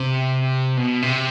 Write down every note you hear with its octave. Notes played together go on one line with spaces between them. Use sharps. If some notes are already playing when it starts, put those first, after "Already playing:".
Already playing: C3
B2
C3